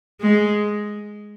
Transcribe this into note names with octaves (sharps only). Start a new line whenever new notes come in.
G#3